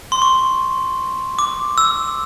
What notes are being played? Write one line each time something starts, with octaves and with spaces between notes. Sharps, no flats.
C6
C#6
D6
E6